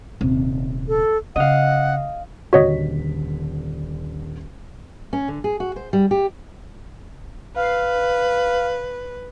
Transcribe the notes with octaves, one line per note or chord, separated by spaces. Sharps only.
D#1 C3
A4
C#3 D#5 F5 F#5
D#1 D3 F#4 C#5 D#5 B6
C#4
D3
G#4
F#4
C5
G3
G4
B4 F5